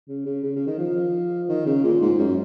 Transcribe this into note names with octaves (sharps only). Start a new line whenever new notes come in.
C#3
C#3
C#3
C#3
D#3
F3
D#3
C#3
A#2
G#2
F#2